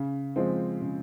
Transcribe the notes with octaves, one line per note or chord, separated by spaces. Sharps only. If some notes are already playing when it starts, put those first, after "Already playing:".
Already playing: C#3
F3 G#3 C4
C#3